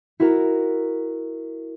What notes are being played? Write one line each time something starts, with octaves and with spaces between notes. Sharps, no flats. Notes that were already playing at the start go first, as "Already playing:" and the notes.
E4 F#4 A#4 A#5